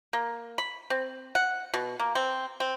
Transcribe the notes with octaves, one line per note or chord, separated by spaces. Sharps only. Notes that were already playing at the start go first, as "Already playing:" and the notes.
A#3
B5
C4
F#5
B2
A#3
C4
C4